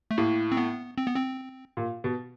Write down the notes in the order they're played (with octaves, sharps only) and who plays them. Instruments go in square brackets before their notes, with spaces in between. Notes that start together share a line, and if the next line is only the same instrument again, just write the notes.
[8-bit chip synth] A3
[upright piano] A2 [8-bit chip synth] A#3
[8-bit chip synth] C4
B3
C4
B3
C4
[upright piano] A#2
B2